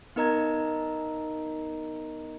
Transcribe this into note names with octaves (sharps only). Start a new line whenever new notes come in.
B3 D#4 A#4 D#5 A#5 G#6